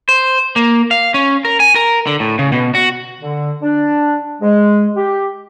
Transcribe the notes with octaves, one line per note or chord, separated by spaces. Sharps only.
C5
A#3
F5
C#4
A#4
G#5
A#4
D3
A2
C#3
B2
F#4
D3
D4
G#3
G4